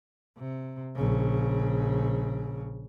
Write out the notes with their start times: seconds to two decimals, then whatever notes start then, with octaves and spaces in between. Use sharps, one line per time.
0.38 C3
0.96 A#1 C#3